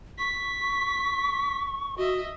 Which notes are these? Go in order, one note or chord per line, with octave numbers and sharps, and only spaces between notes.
C#6 B6
F#4 D#5 E5